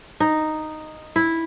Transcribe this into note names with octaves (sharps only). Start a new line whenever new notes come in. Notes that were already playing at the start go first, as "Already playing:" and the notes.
D#4
E4